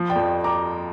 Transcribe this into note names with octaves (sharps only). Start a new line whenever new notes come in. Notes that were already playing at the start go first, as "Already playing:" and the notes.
Already playing: F3
D5 G5
F2
A#5 D6